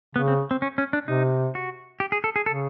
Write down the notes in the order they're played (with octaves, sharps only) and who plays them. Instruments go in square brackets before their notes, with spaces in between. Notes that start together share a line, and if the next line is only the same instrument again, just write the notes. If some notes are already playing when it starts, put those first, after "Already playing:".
[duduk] C#3 [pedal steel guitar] B3
[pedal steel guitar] C4
C4
C#4
C#4
D4
[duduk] C3 [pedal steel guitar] D#4
[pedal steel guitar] F#4
G4
G#4
A4
G#4
[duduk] C#3 [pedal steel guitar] A4